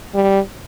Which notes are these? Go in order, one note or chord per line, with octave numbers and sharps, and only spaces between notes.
G3